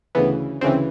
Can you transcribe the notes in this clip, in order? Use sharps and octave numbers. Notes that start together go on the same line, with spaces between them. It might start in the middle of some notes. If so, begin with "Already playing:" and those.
D2 C#3 E3 B3
D2 C#3 E3 C4